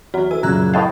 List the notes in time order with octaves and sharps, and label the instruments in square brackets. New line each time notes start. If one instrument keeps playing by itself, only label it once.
[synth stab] E2 [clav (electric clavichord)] F#3 [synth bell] F#4
[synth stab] E3 A3 [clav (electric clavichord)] G#5 [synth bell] E6
[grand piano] F#2 A#2 C#3 [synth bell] F3 F#6 G#6 [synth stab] A#4
[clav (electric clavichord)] A2 D#5 F5 [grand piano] A4 [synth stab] G5 A5